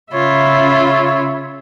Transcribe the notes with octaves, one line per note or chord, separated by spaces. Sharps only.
C#3 F4 C#5 E5 B5